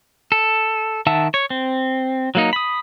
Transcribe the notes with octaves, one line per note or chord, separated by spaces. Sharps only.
A4
D#3 E5 F#5 A5 E6
C#5
C4
F#3 A#3 D#4
B5 D#6